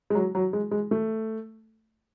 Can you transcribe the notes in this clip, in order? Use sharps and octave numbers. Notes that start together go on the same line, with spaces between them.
G#3
F#3
F#3
G#3
G#3
A3